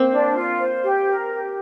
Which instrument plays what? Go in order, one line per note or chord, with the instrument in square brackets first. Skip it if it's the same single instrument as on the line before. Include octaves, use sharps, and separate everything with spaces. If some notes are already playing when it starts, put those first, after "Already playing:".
Already playing: [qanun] A#3 C4 [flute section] C5
[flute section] D4
F4
C5
G4
A#4
G4